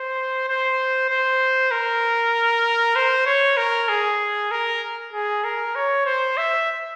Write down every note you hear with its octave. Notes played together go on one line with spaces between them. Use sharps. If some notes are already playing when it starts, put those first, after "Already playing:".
Already playing: C5
C5
C5
A#4
C5
C#5
A#4
G#4
A#4
G#4
A#4
C#5
C5
E5